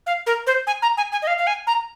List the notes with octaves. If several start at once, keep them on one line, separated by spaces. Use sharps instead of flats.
F5
A#4
C5
G#5
A#5
G#5
G#5
D#5
F5
F5
G#5
A#5